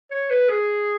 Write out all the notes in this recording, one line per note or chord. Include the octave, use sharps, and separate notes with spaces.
C#5
B4
G#4